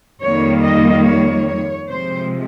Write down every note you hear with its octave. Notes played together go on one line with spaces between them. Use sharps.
F2 D#3 G3 A#3 C#5
D#5
C#5
C#5
C3 F3 G#3 C5